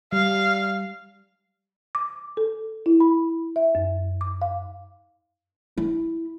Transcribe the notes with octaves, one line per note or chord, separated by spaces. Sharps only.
G3 F5
D6
A4
E4
B5
E5
F#2
D6
F5
E4